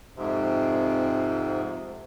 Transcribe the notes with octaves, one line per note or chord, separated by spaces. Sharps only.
F2 G#2 C3